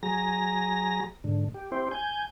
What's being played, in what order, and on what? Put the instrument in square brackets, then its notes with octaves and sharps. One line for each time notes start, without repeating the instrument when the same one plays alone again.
[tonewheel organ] F#3 G#4 A#5 A#6
G#2 D3
G4
C4 E4 G4 C5
G#5 G6